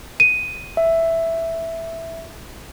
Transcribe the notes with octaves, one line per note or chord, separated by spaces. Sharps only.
D#7
E5